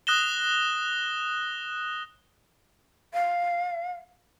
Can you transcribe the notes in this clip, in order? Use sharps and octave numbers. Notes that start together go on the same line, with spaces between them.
D#6 F#6 A#6 E7 G7
F5